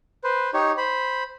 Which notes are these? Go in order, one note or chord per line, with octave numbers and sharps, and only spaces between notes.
B4 C5
D#4 G4 C#5
C5 B5